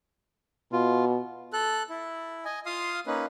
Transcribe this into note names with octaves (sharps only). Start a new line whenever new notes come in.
B2 F4
A4 F#6
E4
D#5 G#5
F4 F5 C6 D#6
A#3 C#4 D#4 B4